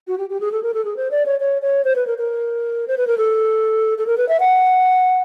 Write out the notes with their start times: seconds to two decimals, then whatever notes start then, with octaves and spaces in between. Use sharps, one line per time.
0.07 F#4
0.18 G4
0.30 G4
0.40 G#4
0.52 A4
0.63 A#4
0.74 A4
0.85 G#4
0.96 C5
1.11 D5
1.26 C#5
1.40 C#5
1.62 C#5
1.84 C5
1.96 B4
2.07 A#4
2.18 A#4
2.88 C5
2.97 B4
3.07 A#4
3.18 A4
3.98 A4
4.07 A#4
4.17 B4
4.28 E5
4.40 F#5